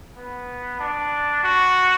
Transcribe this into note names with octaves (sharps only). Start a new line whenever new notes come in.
B3
D4
F#4